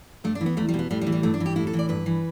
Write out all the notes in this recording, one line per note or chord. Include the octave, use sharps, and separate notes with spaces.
G2 A3
D4
E3
B3
E2 A3
G3
B2
B3
A2 G3
G3
E3
G3
G2 A3
D4
E3
G4
A2 E4
A4
E3
D5
G2 B4
E3